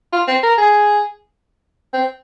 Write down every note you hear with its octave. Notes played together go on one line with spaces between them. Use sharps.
F4
C4
A#4
G#4
C4